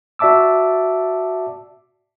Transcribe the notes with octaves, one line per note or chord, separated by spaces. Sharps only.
F#4 D5 E5 A5 D6 E6